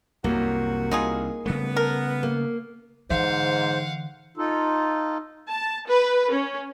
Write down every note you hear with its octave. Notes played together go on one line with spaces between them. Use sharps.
C2 F#2 C3 F#3 A#3 F#4
C2 D#4 F4 G#4
C#3 G3 A3 B3
A#4
A#3
G#2 D3 E3 C5 F5 F#5
D#4 F4 A4
A5
B4
C#4